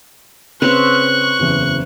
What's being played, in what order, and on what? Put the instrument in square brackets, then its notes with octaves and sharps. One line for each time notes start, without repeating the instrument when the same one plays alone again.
[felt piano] C#3 [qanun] C4 B4 C#5 [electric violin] C#6 F#6
[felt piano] F#1 E2